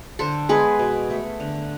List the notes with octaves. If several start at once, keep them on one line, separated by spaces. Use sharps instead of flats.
D3 A4 C5
G#3 B3 G#4 B4
B2
A3
D3